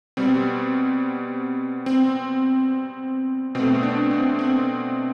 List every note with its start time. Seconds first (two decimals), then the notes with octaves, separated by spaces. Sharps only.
0.17 B2 G3 C4
1.86 C4
3.55 B2 A3 C4
3.83 D4
4.11 C4
4.39 C4